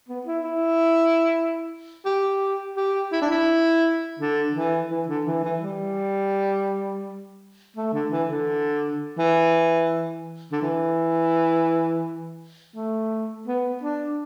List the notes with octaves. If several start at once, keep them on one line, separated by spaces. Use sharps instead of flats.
B3
E4
E4
G4
G4
E4
D4
E4
D3
E3
E3
D3
E3
E3
G3
A3
D3
E3
D3
E3
D3
E3
A3
B3
D4